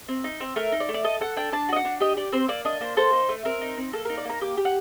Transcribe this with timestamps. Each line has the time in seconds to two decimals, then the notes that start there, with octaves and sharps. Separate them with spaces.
0.08 C4
0.24 D#4
0.40 C4
0.56 A3 A#4
0.72 D#4
0.80 D5
0.88 A3
0.94 D5
1.04 A4 D#5
1.21 A4 F#5
1.36 D4 G5
1.52 D4 A5
1.69 F#4 D#5
1.76 F#5
1.85 D4
2.00 G4 D#5
2.16 G4 D5
2.32 C4 C5
2.48 A#3 D5
2.65 D4 D#5
2.81 A#3 C5
2.97 A4 C5
3.13 D#4
3.29 A3
3.45 C4 A#4
3.61 D#4
3.77 C4
3.93 A#3 A4
4.05 A#4
4.09 D#4
4.17 D5
4.25 A#3 A#5
4.41 G4 D6
4.57 G4
4.65 F#5